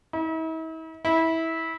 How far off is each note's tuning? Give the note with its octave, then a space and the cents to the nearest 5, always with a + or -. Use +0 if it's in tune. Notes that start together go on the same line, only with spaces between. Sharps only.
E4 -45
E4 -20